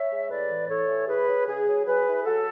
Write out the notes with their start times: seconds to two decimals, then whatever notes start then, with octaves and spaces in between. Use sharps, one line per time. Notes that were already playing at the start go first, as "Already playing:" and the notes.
Already playing: C#5 E5
0.10 G#3
0.30 A2 B4 D5
0.49 E3
0.69 A2 A4 C#5
0.89 E3
1.08 E4 G#4 B4
1.27 F#3
1.47 C#3 G#4
1.67 F#3
1.86 F#3 G#4 B4
2.06 E4
2.25 F#3 F#4 A4